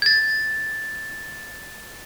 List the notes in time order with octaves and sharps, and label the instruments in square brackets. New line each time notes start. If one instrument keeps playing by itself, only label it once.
[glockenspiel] G#6 A6